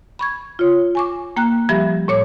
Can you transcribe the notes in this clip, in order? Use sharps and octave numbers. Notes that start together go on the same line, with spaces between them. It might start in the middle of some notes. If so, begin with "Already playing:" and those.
B5 C#6 G#6
F4 C#5
G#5 C#6 D6
A#3 G5 A#5 F#6
F3 G3 G4 E5 B5
A2 C#5 D6